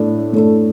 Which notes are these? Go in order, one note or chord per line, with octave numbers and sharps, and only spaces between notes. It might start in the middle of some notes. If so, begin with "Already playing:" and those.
Already playing: A2 A3 D4
A2 A3 D4 A4